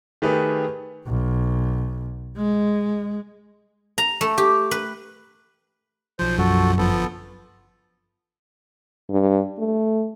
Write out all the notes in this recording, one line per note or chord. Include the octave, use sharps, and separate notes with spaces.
D#3 A3 G4 G#4 B4
B1
G#3
A#5
A3
G4
B4
B1 F3 C5
F#2 F#4 A4
G1 F3 B3 A4
G2
A3